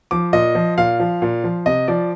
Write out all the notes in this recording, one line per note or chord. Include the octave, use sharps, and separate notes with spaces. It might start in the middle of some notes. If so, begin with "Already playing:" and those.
F3 D6
A#2 D#5
F3
A#2 F5
F3
A#2
F3
C3 D#5
F3 D5